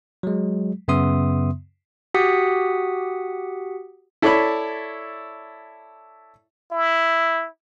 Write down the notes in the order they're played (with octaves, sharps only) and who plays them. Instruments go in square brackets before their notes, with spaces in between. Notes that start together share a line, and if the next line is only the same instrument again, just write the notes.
[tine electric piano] F#3 G#3
F#2 C#3 B3 E5 C6 D#6
[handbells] F#4 G4 F#5 D#6 B6 C#7
[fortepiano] E4 A4 C#5 D5 E5 B5
[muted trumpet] E4